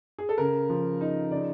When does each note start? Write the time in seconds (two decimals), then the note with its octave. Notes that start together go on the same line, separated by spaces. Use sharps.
0.19 G#4
0.29 A4
0.38 C#3 A#4
0.70 F3
1.01 D#4
1.31 C#3 D5